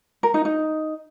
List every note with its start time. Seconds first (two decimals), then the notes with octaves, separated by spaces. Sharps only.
0.23 A#4
0.34 D#4
0.45 D#4